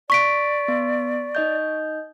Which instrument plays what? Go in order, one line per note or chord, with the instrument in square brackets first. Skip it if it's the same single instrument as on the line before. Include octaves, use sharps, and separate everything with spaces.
[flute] D5 [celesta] C#6 B6 D7
[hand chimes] B3
D#4 D#5 G6